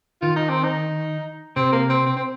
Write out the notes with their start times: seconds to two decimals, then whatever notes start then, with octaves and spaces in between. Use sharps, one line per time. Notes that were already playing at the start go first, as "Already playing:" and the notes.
0.22 D#3 F4
0.36 D#4
0.49 C4
0.64 D#4
1.56 C3 C4
1.73 A#3
1.90 C4
2.06 C4
2.17 C4